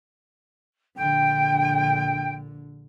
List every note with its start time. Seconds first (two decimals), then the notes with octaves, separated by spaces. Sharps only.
0.96 A#1 D3 G5